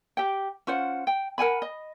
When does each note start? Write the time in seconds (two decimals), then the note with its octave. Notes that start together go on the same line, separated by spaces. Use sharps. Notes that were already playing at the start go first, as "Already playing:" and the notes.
0.17 G4 G5
0.67 C#4 F4 C5 F#5
1.07 G5
1.38 A#4 F#5 G#5 B5
1.62 D#5